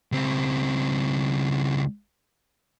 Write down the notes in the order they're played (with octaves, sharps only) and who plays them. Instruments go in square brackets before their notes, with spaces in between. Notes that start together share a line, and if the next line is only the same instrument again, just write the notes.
[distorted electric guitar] C#2 C4